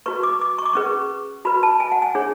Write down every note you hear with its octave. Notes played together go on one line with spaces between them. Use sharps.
F#4 B4 C#6
D6
D6
C#6
D6
C#4 G#4 B4 C#6
F#4 B4 B5
A5
G#5
F#5
G#5
D4 G#4 C#5